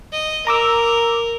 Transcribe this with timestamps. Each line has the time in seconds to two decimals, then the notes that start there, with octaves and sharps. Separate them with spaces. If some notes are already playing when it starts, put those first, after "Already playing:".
0.12 D#5
0.47 A#4 A#5 D6 E6